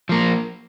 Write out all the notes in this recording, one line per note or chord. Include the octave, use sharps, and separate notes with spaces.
F3 A#3